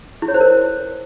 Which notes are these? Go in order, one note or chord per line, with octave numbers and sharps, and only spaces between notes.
E4
C#5
C5
A#4